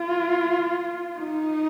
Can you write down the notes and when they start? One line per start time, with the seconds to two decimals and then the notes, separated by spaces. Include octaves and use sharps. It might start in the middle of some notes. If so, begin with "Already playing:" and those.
Already playing: F4
1.18 D#4